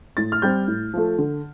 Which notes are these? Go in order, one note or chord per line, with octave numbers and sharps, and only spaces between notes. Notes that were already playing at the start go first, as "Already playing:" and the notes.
A2 A6
F6
G3 C4 G6
A2
F3 A3
D3